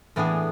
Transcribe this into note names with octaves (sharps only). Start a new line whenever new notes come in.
A2 E3 B3 D4 G#4